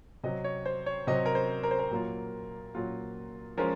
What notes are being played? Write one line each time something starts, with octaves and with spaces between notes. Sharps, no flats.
C3 F#3 C4 D#5
C#5
C5
C#5
C3 F#3 C4 D#5
A#4
C5
A#4
C5
A#4
A#2 F#3 A#3 F4
A#2 F#3 A#3 F4
F3 G#3 C#4 F4 A#4